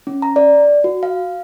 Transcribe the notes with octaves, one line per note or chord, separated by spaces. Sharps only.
C#4
A#5
D5
F#4
F5